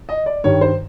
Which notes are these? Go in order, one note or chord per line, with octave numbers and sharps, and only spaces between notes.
D#5
D5
G2 D#3 G3 C#5
C5